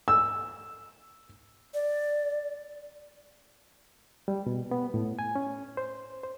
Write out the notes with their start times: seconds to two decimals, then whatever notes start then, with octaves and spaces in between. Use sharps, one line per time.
0.08 E6
1.74 D5
4.28 G3
4.47 B2
4.71 B3
4.94 A2
5.19 G#5
5.36 C#4
5.77 C5
6.24 C5